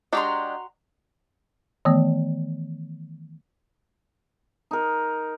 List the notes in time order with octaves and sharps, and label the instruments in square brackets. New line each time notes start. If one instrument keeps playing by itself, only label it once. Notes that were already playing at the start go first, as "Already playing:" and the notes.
[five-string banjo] G#3 D4 G4 [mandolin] F#4 A#5 C6
[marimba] D#3 E3 A3 B3
[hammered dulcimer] D#4 A#4